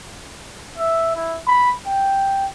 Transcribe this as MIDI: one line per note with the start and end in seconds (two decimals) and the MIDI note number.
0.78 1.12 76
1.16 1.38 64
1.47 1.71 83
1.87 2.46 79